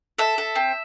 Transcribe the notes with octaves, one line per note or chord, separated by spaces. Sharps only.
A4 E5
A4
C4